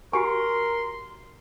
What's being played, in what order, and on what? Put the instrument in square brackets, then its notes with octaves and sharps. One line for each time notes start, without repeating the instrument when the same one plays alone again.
[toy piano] F#4 G4 G#5 [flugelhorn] A#4 [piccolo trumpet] C6 [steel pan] C#6